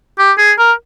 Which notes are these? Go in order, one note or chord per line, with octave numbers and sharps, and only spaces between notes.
G4
G#4
A#4